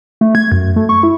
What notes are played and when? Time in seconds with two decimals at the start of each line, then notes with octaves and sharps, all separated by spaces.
0.21 A3
0.35 G#6
0.52 F#2
0.76 A3
0.89 C#6
1.03 E4